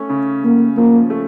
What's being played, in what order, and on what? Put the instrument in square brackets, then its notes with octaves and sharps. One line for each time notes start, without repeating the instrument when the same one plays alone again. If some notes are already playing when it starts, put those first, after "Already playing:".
Already playing: [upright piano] A3 C#4
C#3
[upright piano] C#3 [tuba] A#3
[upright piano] F3 [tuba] A#3
[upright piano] A3